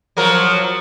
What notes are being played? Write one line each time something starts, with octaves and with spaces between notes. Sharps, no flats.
F3 F#3 A#4